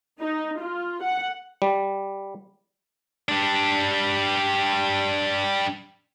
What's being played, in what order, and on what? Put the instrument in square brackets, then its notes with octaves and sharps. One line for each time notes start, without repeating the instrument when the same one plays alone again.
[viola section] D#4
F4
F#5
[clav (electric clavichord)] G3
[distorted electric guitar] G3 D4